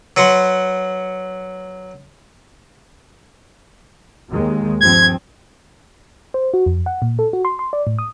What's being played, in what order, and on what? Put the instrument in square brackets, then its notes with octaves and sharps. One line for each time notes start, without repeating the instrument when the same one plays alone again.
[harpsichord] F#3 B4 F#5 C6
[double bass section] D#2 D#3 G#3
[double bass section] G2 F3 C4 [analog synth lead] G#6
[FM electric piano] C5
F#4
F2
F#5
A#2
A4
F#4
C6
C6
D5
A2
D#6